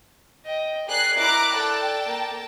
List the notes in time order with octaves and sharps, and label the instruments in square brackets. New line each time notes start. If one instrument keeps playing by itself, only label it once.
[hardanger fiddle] D#5 G5
[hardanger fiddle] G#4 A#4 [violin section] D5 F#6 C7
[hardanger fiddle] E4 [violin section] A#5 D6 F#6
[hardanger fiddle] A4 D5 [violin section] G5 A5
[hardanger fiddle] A#3